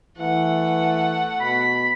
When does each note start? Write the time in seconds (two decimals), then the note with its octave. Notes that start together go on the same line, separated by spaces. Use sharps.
0.18 E3 A3 F#5
1.41 B2 B5